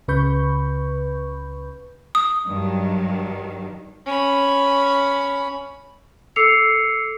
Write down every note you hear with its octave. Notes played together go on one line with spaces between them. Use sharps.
C#2 C#3 B4 B5 C#6 G6
D#6
G2 D#3 F#3
C#4 B5
A4 D6 E6 C7 C#7 F7